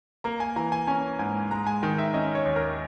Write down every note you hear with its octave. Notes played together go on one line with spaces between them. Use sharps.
A#3 A#5
G#5
E3 A#5
G#5
C#4 G#5
G#2 G#5
G#3 A#5
G#5
D#3 G5
E5
C#4 D#5
C#5
D#2
A#4